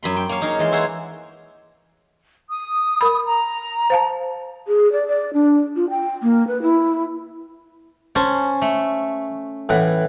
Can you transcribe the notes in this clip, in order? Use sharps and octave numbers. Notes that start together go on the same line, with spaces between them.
F#2 B5 C6
G5
A#3 C#5 F5
C#4 D#4 G#4 A#4 C#5
E3 G#3 C6
E4 G#4 C5 C#5 F#5
D#6
A#4 B5
A#5
C5 F5 A5
G#4
D5
D5
D4
F4
G5
A#3
B4
E4
C#4 C5 A5
A3
A2 E3 F#5